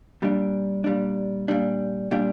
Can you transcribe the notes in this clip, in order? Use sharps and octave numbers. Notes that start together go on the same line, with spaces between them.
A#2 G3 D4
A#2 G3 D4
A#2 G3 D4
A#2 G3 D4